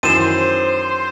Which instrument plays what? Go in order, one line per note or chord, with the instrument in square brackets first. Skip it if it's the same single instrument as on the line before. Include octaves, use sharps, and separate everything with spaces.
[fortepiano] F#2 D#3 E3 [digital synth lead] C5 [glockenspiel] D#7 E7